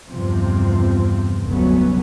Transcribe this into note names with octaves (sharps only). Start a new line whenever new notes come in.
E2 G2 C3 F3 C4
F1 D2 F#3 G3 B3 C#4